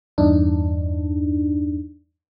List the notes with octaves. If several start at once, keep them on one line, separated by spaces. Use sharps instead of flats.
E2 G2 D4 D#4